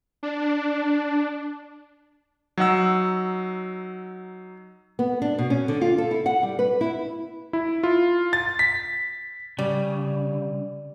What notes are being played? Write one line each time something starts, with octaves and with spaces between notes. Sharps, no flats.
D4
F#3 D#4 F#5 E6
B3
D4
B2
C#4
D3
F4
A4
E4
F#5
G3
B4
E4
E4
F4
A6
B6
C#3 G3